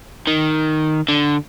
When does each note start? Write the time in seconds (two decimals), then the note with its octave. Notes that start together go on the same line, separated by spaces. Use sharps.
0.27 D#3
1.08 D3